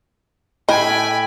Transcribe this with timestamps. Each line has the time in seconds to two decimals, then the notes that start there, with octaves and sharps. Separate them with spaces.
0.69 A2 D#5 G5 G#5 B5